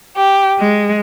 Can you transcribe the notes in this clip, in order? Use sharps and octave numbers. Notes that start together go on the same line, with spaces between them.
G4
G#3